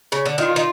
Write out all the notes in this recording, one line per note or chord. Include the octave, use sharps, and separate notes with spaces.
C#3
D3
D#3 F4
D#3